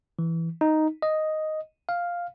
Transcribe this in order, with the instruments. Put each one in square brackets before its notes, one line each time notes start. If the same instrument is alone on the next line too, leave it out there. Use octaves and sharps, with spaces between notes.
[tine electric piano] E3
D#4
D#5
F5